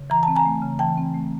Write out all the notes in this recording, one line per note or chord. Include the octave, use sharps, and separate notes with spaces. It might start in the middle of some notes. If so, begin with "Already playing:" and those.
Already playing: C#3
E3 A#5
C4 A5
G#5 A#5
A3
C#3
E3 G5 A5
C4
A3